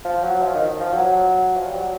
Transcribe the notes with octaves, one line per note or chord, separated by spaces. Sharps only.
F3
F#3
F3
D#3
F3
F#3
F#3
F3
G3
F#3